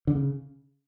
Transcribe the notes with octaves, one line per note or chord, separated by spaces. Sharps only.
D3
C#3